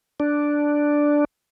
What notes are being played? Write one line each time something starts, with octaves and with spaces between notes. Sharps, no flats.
D4